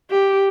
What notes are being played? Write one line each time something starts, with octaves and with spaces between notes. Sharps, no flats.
G4